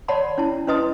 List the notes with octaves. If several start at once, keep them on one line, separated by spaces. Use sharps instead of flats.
C#5 D5 F#5 A5 B5 C6
C#4 E4 A5
C#4 E4 B4 D#5 C6 D#6